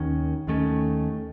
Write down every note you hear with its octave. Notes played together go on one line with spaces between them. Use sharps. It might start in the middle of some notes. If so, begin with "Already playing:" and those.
Already playing: D#2 D#3 C#4
D#2 D#3 A3 C#4